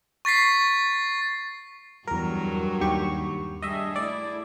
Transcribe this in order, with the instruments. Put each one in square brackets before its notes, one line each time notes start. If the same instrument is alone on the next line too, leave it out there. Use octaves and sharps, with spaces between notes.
[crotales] C#6 A6 B6 C7
[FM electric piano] E2 A#4 [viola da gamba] G2 F#3 G3
[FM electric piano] D#2 G4 C#6
[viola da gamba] G3 D4 G#4 [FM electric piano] D#5 E5
[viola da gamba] A3 E4 [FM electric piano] D5